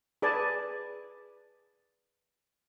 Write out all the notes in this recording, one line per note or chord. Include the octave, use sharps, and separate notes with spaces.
G#4 B4 D5 G#5 A5